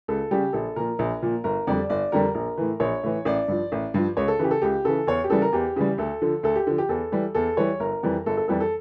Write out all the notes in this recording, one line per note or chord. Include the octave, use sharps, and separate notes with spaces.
C#2 A4
C#3 G3 G4
A#1 A4
A#2 F3 A#4
A#1
A#2 F3
G1 A#4
F2 D3 G3 D5
G1 D5
F2 D3 G3 A#4
A#1 A#4
A2 E3
A#1 C#5
A2 E3
A1 D5
G2 F3
A1
G2 F3
C#2 C#5
A4
C#3 E3 G4
A4
C#2 G4
C#3 E3 A4
E2 C#5
G4
C#3 E3 G3 A4
A#4
E2 G4
C#3 E3 G3
D2 A4
D3 F3
D2 A4
G4
D3 F3
G4
E2 A4
E3 G3
E2 A4
E3 G3 C#5
G1 A#4
F2 E3 G3
G1 A4
A4
F2 E3 G3 A4
A4